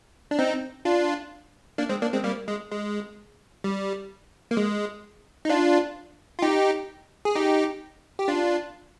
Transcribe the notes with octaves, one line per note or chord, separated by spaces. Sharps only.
D4
C4 D#4
D4 F4
A#3 D4
G#3 C4
A#3 D4
G#3 C4
G3 A#3
G#3
G#3
G3
A#3
G#3
D#4
D4 F4
F4
D#4 G4
G#4
D#4 G4
G4
D4 F4